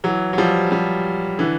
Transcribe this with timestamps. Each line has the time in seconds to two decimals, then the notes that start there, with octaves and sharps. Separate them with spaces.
0.04 E3 F#3
0.33 F#3
0.38 F3 G3
0.71 F3 G3
1.39 D3 E3